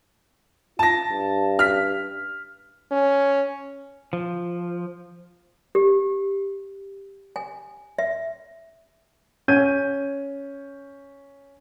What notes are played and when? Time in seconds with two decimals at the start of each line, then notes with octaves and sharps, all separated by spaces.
0.79 F4 A5 A#6
1.09 G2
1.59 F6 B6
2.91 C#4
4.13 F3
5.75 G4
7.36 G#5
7.98 E5
9.48 C#4 G6 G#6 D#7